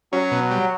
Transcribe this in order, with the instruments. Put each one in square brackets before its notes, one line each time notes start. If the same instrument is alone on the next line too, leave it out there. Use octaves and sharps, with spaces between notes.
[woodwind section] F#3 [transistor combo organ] C#4
[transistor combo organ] B2
G3